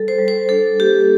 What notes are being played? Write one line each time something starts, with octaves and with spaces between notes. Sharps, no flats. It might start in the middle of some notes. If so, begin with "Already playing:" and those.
Already playing: G3 A4
C5
G3
C5
D4 A4
A#3 G4